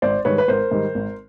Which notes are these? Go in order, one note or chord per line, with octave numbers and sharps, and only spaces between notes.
G#1 C5 D5
G#2 D#3 G3 B4 C#5
B4
G#1 A#4 C5
G#2 D#3 G3
G#1